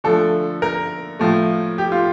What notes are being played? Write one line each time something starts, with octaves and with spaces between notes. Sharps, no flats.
D3 F3 A3 A4
A#4
A2 F3 A3
G4
F4